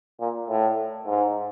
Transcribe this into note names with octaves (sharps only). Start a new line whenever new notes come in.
A#2
A2
G#2